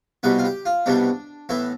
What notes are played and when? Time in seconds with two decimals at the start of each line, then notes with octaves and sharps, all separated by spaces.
0.23 C2 B2 G3 B3 B4
0.39 F4
0.45 G4
0.66 F4
0.86 C2 B2 G3 B3 D4
1.49 A2 E3 B3 E4